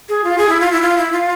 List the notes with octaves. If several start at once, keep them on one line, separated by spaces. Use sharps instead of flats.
G#4
F4
G#4
E4
F4
E4
F4
E4
F4